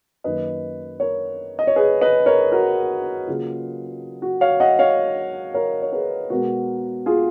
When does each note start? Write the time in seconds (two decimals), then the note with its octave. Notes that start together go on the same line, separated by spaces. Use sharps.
0.24 F#2 D#3 A#3 B4 D#5
1.00 A#4 C#5
1.59 D#5
1.67 C#5
1.76 G#4 B4
2.01 B4 D#5
2.26 A#4 C#5
2.52 F#4 A#4
3.27 C#3 F#3 A#3 F4 G#4
4.22 F#4
4.41 C#5 F5
4.60 D#5 F#5
4.79 C#5 F5
5.54 A#4 C#5
5.82 C#5
5.92 G#4 B4
6.30 B2 G#3 B3 F#4 A#4
7.06 F4 G#4